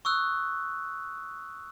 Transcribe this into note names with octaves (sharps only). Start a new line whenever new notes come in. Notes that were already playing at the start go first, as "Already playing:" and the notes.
C#6 D#6 E6 F#6